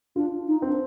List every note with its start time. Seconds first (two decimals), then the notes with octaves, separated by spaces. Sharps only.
0.16 D4 F4
0.47 D#4
0.62 C4 D4